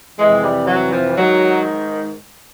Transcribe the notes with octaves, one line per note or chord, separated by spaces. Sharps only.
F2 C3 E3 G#3
G3
F#3
F3
G#2 D#3 F#3